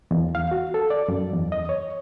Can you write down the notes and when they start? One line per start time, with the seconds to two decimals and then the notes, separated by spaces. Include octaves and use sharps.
0.11 E2
0.35 F5
0.51 F#4
0.74 A4
0.90 D5
1.08 F#2
1.33 E2
1.52 D#5
1.69 C#5